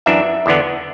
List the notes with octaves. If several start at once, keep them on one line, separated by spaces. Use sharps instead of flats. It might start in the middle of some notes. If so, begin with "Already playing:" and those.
F#2 E3 D4 E5
E2 D3 B3 D4